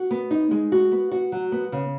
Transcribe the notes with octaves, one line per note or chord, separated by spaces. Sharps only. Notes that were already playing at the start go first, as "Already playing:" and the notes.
Already playing: F#4
B3
D#4
G#3
F#4
B3
F#4
F#3
B3
C#3